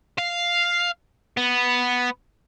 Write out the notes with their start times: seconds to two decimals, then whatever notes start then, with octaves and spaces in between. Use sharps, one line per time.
0.18 F5
1.37 B3